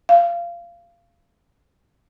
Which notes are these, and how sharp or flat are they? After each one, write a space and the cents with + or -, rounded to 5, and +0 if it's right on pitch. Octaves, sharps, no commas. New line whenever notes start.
F5 -20